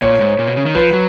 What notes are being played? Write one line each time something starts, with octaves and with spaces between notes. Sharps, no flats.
A#2 C#5
G#2
A#2
B2
C#3
D#3
F3 B4
F#3